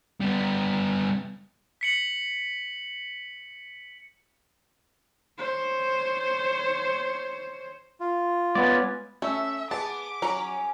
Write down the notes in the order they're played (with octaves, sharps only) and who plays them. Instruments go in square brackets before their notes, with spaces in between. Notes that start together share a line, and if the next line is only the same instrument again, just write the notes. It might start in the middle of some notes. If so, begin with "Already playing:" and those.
[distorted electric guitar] G3 B3
[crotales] B6 C#7 F#7
[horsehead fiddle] C5 C#5
[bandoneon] F4
[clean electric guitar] G#3 B4 F#5 [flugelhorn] B3 [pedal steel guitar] C#4 D5
[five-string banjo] A3 [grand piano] C#4 [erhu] E5
[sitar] B3 [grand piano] G#4 [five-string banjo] A5 [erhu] D6
[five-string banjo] F#3 A#5 [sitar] C#4